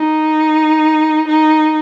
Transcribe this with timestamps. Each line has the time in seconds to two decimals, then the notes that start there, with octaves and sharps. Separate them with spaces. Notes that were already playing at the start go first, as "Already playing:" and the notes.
Already playing: D#4
1.28 D#4